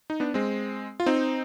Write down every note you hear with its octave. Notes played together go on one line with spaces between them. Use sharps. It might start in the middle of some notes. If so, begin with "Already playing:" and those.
D#4
B3 D4
G#3 C4
F4
C4 D#4